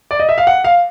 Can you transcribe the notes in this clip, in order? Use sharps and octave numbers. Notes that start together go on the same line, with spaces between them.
D5
D#5
E5
F5
F#5
F5